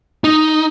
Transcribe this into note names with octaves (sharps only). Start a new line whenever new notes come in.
D#4